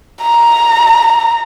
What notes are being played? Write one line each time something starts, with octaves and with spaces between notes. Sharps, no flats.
A#5